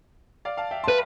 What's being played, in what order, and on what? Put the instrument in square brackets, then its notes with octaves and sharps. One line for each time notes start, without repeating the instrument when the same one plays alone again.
[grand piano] D5 F5
F5 A5
E5 G5
[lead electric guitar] B4 [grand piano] A5 C6